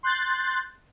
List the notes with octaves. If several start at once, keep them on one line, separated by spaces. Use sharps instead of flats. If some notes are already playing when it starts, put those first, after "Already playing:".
C6 F#6 G6 A6